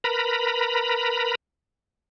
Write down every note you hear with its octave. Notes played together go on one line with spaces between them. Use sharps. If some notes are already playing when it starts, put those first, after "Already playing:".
A#4 B4 A#5 B5